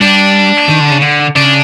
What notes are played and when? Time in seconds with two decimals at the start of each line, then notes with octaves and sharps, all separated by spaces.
0.01 G3 D4
0.69 D#3
0.80 D3
0.91 C#3
1.02 D3
1.36 C#3 D4